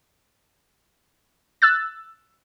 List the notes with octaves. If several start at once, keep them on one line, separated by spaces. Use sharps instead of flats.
E6 F#6 A6